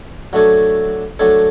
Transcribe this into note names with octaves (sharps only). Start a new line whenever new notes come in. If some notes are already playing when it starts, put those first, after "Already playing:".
F#3 A3 D4 A4 C#5
F#3 A3 D4 A4 C#5